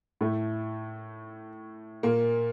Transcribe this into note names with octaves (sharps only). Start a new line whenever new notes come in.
A2 A3
A#2 A#3